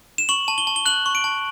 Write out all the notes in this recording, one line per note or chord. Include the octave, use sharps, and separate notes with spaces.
E7
C#6 F#7
A5
G7
A5
G7
F#6 F#7
C#6
D7
A5